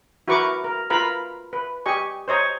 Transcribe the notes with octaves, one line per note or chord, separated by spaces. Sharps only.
E4 F#4 A#4 B4 C#6 D6
A#4
F4 A#4 B4 F5 A#5 B5
B4
G4 D#5 G#5 C#6
C5 C#5 D#5 A#5